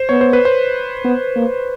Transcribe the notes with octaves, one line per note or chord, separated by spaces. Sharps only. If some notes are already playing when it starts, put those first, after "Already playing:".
Already playing: C5
B3 C#5
C5
B4
C5
B3
A#3